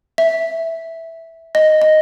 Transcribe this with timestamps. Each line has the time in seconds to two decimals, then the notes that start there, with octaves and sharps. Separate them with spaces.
0.18 E5
1.55 D#5
1.82 D#5